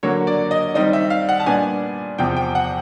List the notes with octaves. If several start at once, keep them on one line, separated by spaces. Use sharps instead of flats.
D3 F#3 A#3 C#5
D5
D#5
D#3 G3 C4 D#4 D#5
E5
F5
F#5
A5
A#2 G3 B3 D4 G#5
E2 C3 F3 G5
G5
F#5